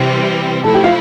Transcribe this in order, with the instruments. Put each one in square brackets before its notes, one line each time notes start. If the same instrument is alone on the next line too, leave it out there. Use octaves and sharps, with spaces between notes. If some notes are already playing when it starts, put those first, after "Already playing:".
Already playing: [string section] C3 E3 G3 C4
[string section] F3 A3 E4 [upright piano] A4 A5
[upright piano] G4 G5
F4 F5